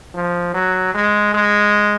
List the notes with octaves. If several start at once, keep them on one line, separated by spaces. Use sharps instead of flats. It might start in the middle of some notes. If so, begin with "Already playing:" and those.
F3
F#3
G#3
G#3